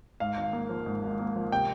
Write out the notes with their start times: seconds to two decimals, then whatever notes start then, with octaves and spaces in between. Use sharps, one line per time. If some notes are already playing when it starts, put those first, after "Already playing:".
0.20 G#2 F5
0.37 G#1
0.53 A#3
0.69 F3
0.86 G#2
1.03 G#1
1.19 A#3
1.36 F3
1.52 C3 G5